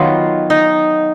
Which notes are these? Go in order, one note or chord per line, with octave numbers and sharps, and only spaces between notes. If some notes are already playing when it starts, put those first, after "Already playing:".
Already playing: D#3 F#3 B3 F4
D#4